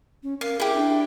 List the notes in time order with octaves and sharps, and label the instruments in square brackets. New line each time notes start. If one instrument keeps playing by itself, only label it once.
[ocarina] C#4
[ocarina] A#4 [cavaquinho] F5
[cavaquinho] E4 G4 [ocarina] G#4
[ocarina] D4